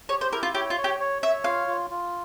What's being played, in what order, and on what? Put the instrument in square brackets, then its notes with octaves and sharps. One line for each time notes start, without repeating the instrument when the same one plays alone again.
[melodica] G4 [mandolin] C#5
[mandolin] C5
[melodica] E4 [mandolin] A#4
[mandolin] F4
[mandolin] G4 [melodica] C#5
[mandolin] F4
[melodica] C#5
[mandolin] G4
[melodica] C#5
[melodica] C#5 [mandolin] E5
[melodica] F4 [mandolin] F5
[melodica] F4
F4